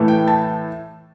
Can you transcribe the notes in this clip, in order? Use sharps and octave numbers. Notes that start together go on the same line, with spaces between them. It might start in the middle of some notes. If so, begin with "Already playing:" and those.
Already playing: A2 E3 A3
G5
A5